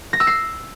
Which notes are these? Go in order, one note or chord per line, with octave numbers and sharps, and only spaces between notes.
A#6
E6
C7